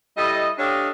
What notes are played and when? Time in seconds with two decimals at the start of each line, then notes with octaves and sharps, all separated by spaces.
0.17 G3 E4 A4 D#5
0.58 D4 G4 A4 C#5 D#5 F5